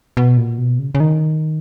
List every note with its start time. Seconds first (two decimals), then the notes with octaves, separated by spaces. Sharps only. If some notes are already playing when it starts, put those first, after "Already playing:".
0.17 B2
0.37 A#2
0.58 B2
0.79 C#3
0.95 C#3
1.00 D#3